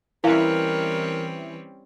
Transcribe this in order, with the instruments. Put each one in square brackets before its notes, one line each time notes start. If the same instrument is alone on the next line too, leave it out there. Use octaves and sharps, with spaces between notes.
[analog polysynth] E3 [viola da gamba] G3 C4 C#4 [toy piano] E4 F5 [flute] A#4